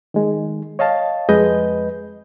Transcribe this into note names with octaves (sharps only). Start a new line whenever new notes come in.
D#3 G#3
C#5 D#5 F5 A5
F2 G#3 B4 D#5 G6